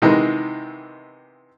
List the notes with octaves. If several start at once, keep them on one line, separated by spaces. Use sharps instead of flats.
C3 D#3 E3 G#3 B3 D#4